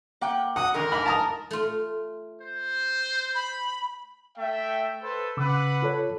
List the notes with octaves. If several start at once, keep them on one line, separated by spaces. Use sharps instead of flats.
A#3 F#5 G5
F#3 F#5 D#6
D3 D#3 G#3 A#4
G#2 B5
A5 A#5 D#6
A3 F4
C5
B5
A3 E5 G5
A4 B4 C5
C#3 B4 F#5 B5 D6 E6
F4 A4 C#5